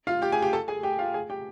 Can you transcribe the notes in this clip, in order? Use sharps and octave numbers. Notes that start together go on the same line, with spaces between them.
F4 F5
G4 G5
G#4 G#5
G4 G5
A4 A5
G#4 G#5
G4 G5
F4 F5
G#4 G#5
G4 G5